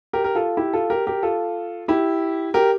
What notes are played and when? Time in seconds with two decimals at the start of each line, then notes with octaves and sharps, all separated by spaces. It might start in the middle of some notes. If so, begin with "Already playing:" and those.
0.13 G4 A#4
0.24 A#4
0.35 F4 A4
0.57 E4 G4
0.73 F4 A4
0.90 G4 A#4
1.07 G4 A#4
1.23 F4 A4
1.88 E4 G4
2.54 G4 A#4